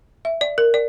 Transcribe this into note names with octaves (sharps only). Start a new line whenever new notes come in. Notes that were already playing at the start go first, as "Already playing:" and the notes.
E5
D5
A#4
D5